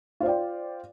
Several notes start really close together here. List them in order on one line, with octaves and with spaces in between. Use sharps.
F4 C5 D5 G5